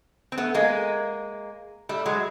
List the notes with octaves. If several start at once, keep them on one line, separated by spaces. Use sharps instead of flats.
C4
A3 B3
G#3 A#3
G3 A3
F#3 G#3